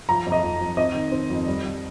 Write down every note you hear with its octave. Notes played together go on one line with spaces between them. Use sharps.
F3 A#5
F2
D#5
F2
F2
C4 D#5
D#3
C4
F2
G3
G3